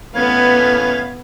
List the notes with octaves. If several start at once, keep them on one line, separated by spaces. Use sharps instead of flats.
A2 E3 A3 B3 C#4 B4 F5 G#6